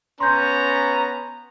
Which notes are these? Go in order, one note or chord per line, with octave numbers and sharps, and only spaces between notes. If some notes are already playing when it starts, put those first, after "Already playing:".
B3 C#4 A#5 C6 G6